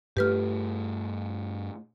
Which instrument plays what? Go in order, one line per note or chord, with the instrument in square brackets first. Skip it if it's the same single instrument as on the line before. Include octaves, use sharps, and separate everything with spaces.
[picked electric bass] G2 A3 [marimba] G4 B4 F6